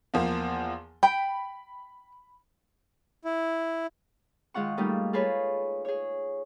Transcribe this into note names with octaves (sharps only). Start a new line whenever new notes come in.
E2 F3 A#3
G5 B5
E4
D#3 G#3 F4 F#5 C#6
G3 A3 A#3 D#4 F4
F4 G#4 A4 B4 C#5
G#4 C#5